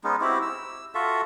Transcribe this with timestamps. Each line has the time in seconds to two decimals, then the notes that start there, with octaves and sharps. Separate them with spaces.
0.04 G#3 B3 C#4 D#4
0.21 C4 E4 F#4 G4
0.42 E6
0.95 F4 F#4 A4 E5